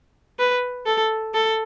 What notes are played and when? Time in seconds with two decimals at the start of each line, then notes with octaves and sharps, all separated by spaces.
0.39 B4
0.87 A4
1.34 A4